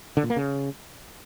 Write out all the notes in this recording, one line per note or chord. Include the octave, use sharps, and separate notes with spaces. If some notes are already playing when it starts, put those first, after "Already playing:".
D3
A#2
A#3
C#3